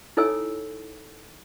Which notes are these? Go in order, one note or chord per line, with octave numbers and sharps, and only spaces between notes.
D#4 E4 A4 C#5 G#5 E6